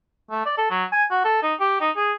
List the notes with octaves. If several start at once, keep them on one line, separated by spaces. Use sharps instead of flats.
A3
D5
A4
F#3
G#5
F#4
A4
D#4
G4
D#4
G#4